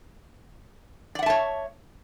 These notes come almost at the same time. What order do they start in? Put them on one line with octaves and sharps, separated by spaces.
D5 F#5 E5 A5 C#5